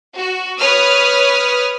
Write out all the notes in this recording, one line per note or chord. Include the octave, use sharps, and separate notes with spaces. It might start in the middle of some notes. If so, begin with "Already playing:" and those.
F#4
B4 C#5 D#6 F6